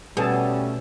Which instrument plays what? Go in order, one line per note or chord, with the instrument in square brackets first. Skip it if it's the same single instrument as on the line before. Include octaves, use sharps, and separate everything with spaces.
[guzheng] B2 [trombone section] G3 A3 C#4 [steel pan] G#4 A4 A5